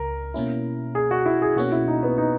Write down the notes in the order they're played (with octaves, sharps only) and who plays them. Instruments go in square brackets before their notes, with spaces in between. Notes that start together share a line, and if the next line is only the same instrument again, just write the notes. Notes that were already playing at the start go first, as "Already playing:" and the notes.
Already playing: [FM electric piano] C#2 C#3 [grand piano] A#4
[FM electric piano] B2 A#3 C#4 E4
[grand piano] G#4
F#4
E4
G#4
[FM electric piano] B2 A#3 C#4 [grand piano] F#4
[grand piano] E4
D#4
B3
D#4